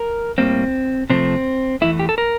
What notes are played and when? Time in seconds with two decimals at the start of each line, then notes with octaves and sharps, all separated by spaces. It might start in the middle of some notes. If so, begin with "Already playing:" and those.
Already playing: A#4
0.38 A2 G3 A#3 C4
1.10 C3 F3 A3 C4
1.81 E2 E3 A3 E4
1.99 G4
2.09 A4
2.18 A#4